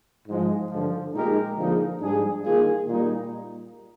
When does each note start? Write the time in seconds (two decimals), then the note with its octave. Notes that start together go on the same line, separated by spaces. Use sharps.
0.28 G#2 F3 G#3 D#4
0.71 G2 D3 F3
1.15 A#2 G#3 D#4 G4 A#4
1.57 D3 F3 A#3 D#4 G#4
2.01 G#2 G3 D4 G#4
2.45 D#3 A#3 F4 G#4
2.87 A#2 G3 A#3 D#4